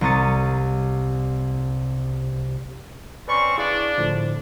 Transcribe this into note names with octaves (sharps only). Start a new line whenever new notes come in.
C2 A#5 C#6 D#6 A6 C#7
C4 C#4 B4 D5 B5 C#6
D4 E4 G#4 D5 F5
A2 D3 F3